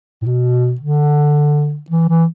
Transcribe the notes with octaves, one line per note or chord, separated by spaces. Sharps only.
A2
B2
D3
E3
E3